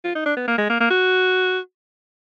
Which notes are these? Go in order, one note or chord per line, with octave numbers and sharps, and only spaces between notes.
F4
D#4
D4
B3
A#3
G#3
A#3
A#3
F#4